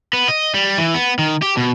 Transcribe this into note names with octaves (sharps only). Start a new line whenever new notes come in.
B3
D#5
G3
E3
B3
D#3
G4
B2